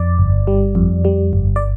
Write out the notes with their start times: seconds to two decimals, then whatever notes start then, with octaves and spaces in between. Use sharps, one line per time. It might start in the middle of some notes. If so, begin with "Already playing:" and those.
Already playing: F2 D5
0.19 G1
0.47 G3
0.75 F2
1.05 G3
1.33 G1
1.56 D5